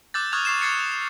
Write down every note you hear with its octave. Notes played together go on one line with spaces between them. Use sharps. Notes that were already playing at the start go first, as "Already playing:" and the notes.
D6 E6 F#6 G6 A6
C#6 D#6 F6 F#6 G#6 F7
C#6 C7 E7
C#6 F6 G#6 A6 C7 C#7
E7